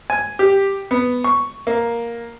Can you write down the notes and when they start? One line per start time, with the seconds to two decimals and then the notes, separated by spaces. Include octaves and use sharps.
0.10 G#5
0.39 G4
0.91 B3
1.24 C#6
1.67 A#3